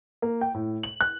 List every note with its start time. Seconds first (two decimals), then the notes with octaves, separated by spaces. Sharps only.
0.22 A#3
0.41 G5
0.54 A2
0.83 F#7
1.01 F#6